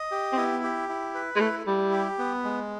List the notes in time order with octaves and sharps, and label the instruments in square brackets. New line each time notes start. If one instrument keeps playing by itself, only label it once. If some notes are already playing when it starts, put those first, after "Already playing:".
Already playing: [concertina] D#5
G4
[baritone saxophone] C4
[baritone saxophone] B3 [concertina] E4
[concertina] G4
E4
B4
[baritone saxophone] G#3
[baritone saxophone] A3 [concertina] E4
[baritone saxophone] G3 [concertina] E4
[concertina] G4
B3
G#3